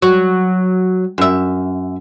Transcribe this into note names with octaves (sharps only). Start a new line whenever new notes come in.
F#3
F#2 E5